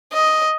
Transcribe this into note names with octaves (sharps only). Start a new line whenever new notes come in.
D#5